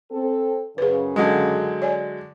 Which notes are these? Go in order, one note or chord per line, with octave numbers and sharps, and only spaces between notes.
C4 A4
F#2 C#3 G#4 B4
D3 F#3 G#3 D#5
C#5 D5 G#5